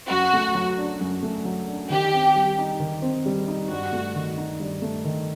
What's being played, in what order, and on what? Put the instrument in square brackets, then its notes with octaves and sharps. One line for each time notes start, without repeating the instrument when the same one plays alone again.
[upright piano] F#2 [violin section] F#4
[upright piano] A3
F#3
D4
F#2
A3
F#3
D4
[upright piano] D#3 [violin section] G4
[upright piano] C4
G3
D#4
D#3
C4
G3
D#4
[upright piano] G2 [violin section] F#4
[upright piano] A3
D#3
D#4
G2
A3
D#3